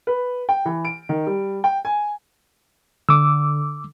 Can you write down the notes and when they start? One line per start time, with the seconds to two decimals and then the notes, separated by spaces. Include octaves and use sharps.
0.07 B4
0.49 G5
0.65 E3
0.85 D7
1.09 D#3
1.27 G3
1.64 G5
1.85 G#5
3.09 D3 D6 E6